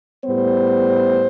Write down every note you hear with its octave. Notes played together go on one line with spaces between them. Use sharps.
A2 G3 B3 C5